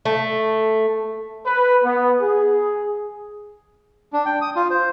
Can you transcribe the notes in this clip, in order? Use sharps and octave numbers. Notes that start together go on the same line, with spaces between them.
A3
B4
B3
G#4
D4
G5
D#6
F4
C5